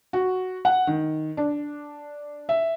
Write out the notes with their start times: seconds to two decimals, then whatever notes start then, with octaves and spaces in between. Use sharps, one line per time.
0.13 F#4
0.65 F#5
0.87 D#3
1.37 D4
2.49 E5